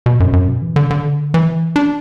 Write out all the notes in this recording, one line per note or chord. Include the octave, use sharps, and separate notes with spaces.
B2
F#2
F#2
B2
E3
D3
D3
E3
D4